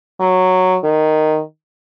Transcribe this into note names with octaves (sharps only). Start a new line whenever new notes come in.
F#3
D#3